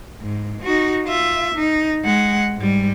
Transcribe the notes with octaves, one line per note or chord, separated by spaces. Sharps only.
G#2
D#4 F#4
F4 E5
D#4
G#3 F#5
G#2 G3